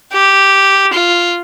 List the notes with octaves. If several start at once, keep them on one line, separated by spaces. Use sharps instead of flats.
G4
F4